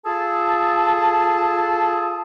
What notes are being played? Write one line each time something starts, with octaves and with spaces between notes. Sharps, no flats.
F4 G#4 A4 A5